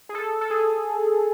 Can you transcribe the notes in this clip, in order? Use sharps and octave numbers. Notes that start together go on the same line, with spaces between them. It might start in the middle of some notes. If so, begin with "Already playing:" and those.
G#4
A4
A4
G#4